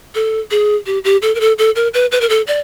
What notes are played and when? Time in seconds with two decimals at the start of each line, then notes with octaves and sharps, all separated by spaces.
0.15 A4
0.51 G#4
0.86 G4
1.04 G4
1.22 A4
1.35 A#4
1.40 A4
1.58 A4
1.76 A#4
1.94 B4
2.12 B4
2.21 A#4
2.29 A4
2.47 D5